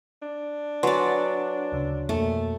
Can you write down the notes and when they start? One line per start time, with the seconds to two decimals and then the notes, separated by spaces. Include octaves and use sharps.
0.22 D4
0.83 F#3 B4 D5 F#5 G#5 C6
1.72 D2 C#3
2.09 F2 B2 A3 A#3